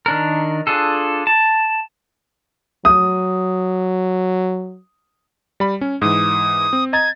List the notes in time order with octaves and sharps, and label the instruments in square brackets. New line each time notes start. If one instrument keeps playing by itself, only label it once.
[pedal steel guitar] D#3 D4 A#4
D4 F4 G#4 A4
A5
[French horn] F#3 [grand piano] D#6
[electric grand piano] G3 B5
C#4
[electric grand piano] G#2 E3 [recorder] D#6
[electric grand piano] C4
[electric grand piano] D#5 A#5 A6 [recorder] G#6